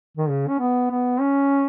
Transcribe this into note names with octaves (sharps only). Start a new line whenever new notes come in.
D#3
C#3
C#4
B3
B3
C#4